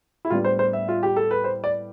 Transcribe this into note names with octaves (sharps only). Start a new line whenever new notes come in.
E4
A2 G3 B3 D4 F4
C5
C5
E5
F4
G4
A4
B4
C5
D5